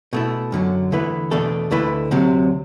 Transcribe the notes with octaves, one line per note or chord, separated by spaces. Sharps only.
B2 A3 E4
F#2 D3 F#3
E2 D3 A3 E4 B4
E2 B2 A3 D4 A4
D2 D3 A3 E4 B4
D2 C3 F#3